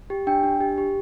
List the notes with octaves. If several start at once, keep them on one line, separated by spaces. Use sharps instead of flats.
G4
D4 G5
D4
G4
G4